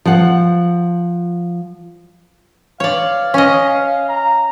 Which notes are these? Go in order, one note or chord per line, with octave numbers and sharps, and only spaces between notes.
F3 F#5
C#5 D5 F5
C#4 D#5
A#5